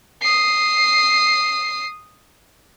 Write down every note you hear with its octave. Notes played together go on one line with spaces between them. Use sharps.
D#6 C7